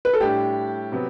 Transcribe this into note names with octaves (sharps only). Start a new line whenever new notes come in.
B4
A4
A2 G3 D4 G4
C3 F#3 B3